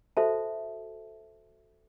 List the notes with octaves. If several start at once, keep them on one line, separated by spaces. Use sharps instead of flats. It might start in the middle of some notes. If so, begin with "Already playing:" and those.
F#4 A4 C5 E5 A5